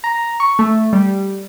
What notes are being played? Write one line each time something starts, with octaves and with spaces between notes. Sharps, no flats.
A#5
C#6
A3
G3